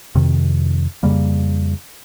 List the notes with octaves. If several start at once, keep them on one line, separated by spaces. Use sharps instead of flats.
F2 C3 D#3
F2 C#3 G3 A#3